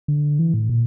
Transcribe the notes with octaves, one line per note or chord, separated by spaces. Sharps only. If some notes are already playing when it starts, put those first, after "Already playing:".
D3
E3
A2
A#2